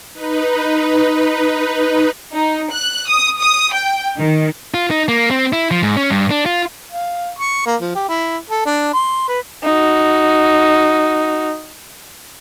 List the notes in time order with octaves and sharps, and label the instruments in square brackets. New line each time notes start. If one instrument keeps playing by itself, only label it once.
[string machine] D#4 B4
[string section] D#4
F#6
D#6
D#6
G5
D#3
[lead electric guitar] F4
D#4
A#3
C4
E4
F3
G#2
C#4
G2
D4
F4
[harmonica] F5
C#6
A#3
F3
G4
E4
A4
D4
C6
B4
[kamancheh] D#4 F#4